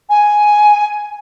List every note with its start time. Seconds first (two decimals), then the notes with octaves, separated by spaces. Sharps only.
0.10 G#5